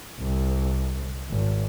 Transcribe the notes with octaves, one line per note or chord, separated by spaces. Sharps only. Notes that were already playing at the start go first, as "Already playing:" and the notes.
C2
G#1